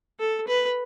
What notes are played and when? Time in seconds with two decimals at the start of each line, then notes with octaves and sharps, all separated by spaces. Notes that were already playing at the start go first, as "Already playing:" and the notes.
0.20 A4
0.48 B4